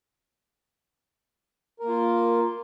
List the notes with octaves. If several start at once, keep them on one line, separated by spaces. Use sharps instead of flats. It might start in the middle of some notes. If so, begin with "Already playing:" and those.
A#3 F4 A#4